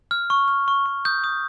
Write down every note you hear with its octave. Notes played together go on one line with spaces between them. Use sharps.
F6
C#6
F6
C#6
C#6
D#6 G6
D#6